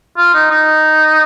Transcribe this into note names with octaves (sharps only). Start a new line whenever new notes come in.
F4
D#4
D#4